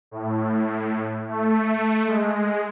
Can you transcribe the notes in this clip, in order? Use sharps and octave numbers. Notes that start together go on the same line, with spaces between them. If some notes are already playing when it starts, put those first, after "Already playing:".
A2
A3
G#3